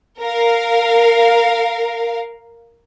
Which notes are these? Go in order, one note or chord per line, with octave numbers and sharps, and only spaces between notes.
A#4 F5